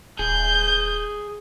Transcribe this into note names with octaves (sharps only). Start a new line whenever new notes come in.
D#1 G#4 G6